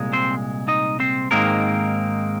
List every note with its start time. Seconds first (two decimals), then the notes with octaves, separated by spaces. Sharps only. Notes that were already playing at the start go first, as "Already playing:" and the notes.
Already playing: C2 A#2 G#3
0.13 C4 C5
0.68 D#4 D#5
1.00 C4 C5
1.31 G#2 D#3 G#3 A#3 C4 A#4